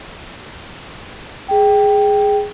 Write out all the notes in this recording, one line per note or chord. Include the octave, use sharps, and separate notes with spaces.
G#4 G5